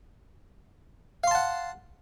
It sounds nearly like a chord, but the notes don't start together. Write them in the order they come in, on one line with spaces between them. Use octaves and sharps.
F5 C6 A5 F#5